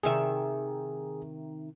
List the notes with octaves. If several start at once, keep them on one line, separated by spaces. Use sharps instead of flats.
C3 D#3 G#4 E5